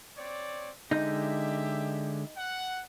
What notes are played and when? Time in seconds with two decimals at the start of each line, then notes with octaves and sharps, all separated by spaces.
0.17 C4 C#5 D5
0.91 D3 G#3 D#4 G4 E5 G6
2.37 F#5